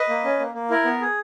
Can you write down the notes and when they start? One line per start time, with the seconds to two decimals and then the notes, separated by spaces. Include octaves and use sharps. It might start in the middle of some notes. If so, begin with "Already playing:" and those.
Already playing: B4 D#5
0.09 A#3
0.25 C#4
0.39 A#3
0.55 A#3
0.70 E4 A#4
0.85 B3
1.01 G#4